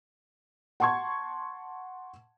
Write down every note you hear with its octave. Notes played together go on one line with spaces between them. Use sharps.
F#5 A5 C6 C#6 G#6